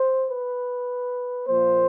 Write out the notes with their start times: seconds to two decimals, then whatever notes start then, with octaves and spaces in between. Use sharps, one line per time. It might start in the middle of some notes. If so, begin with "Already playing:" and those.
Already playing: C5
0.29 B4
1.48 A#2 F3 A#3 C5